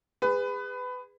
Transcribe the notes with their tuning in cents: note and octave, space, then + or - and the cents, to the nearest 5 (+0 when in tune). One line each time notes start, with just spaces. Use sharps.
G#4 -30 B4 +20